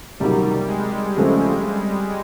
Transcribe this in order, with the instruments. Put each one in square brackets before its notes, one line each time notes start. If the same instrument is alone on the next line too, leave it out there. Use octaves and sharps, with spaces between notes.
[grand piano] C#2 C3 D#3 F#3 A#3 [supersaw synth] G3
[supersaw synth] G#3
[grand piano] C#2 C#3 F3 A3 C4